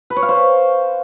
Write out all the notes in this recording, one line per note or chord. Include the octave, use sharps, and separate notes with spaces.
B4
C#5
F5
C5